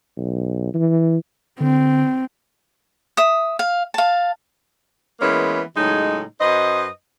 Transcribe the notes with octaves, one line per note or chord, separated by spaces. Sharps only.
B1
E3
D3 C4
E5 D#6
F5
F5 A5
E3 G#3 A#3 B3 C#4
A2 C#3 F#3 G#3 D#4
F#2 B4 C5 D#5